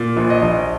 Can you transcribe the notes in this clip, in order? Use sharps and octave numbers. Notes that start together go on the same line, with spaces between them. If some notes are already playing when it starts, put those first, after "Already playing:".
Already playing: A#2
A#1
D#5
A#1